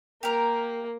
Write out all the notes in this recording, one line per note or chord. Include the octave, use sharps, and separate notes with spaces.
A#3 G4 A#4